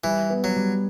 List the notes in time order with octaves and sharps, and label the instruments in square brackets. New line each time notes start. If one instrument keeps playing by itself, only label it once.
[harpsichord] E3 [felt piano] G3
[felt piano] B3
[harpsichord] F#3
[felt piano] G3